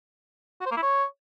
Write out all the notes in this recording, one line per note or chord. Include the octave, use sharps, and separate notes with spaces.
F#4
C5
A#3
E4
C#5